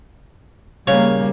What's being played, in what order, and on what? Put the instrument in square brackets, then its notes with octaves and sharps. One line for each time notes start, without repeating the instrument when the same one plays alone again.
[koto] C#3 [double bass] G3 A#3 [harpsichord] C#5